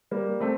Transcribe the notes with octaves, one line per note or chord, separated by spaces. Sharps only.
G3 A#3
A3 C4